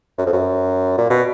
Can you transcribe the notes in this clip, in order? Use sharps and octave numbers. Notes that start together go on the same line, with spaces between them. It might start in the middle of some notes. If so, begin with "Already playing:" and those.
F#2
F2
F#2
A#2
B2